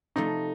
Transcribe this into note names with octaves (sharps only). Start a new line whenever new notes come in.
C3 F3 A3 D#4